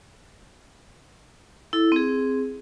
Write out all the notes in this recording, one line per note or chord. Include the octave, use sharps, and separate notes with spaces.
E4 A4
C4 G#4